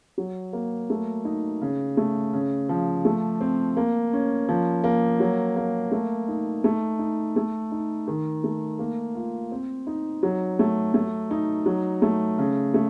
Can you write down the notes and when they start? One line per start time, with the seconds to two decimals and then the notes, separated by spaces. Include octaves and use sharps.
0.18 F#3
0.53 A#3
0.90 A3
1.25 D#4
1.61 C#3
1.97 A3
2.33 C#3
2.69 F3
3.05 A3
3.41 C4
3.77 A#3
4.13 C#4
4.49 F3
4.84 A#3
5.20 F#3
5.56 A#3
5.92 A3
6.28 D#4
6.64 A3
6.99 D#4
7.36 A3
7.72 D#4
8.08 D#3
8.44 A3
8.79 A#3
9.15 F4
9.52 C4
9.87 D#4
10.23 F#3
10.59 A3
10.94 A3
11.31 D#4
11.66 F#3
12.02 A3
12.38 C#3
12.74 A3